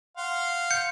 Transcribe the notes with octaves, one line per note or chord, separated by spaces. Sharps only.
F5 F#5 C6
G6 C#7